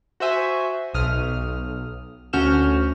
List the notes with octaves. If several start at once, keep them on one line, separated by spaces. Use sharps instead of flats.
F#4 C5 E5 G#5
B1 D#6 F6
D2 C#4 F#4 F6 G6 E7